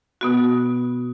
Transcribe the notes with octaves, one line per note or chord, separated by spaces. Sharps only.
B2 B3 F#4